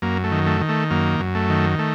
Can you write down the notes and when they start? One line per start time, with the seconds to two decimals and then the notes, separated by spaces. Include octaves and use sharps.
0.02 F#2 A#3
0.24 A3
0.31 D#3
0.46 A3
0.61 D#3
0.69 A3
0.91 F#2 A#3
1.20 F#2
1.35 A3
1.50 D#3
1.79 A3